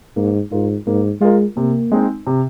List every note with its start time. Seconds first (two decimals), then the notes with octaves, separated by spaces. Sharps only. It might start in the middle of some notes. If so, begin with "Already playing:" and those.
0.16 G#2 A#3
0.51 G#2 F4 A#4
0.87 G#2 A#3
1.21 G#3 F4 A#4
1.57 C3 A#3
1.92 G#3 C4 D#4
2.27 C3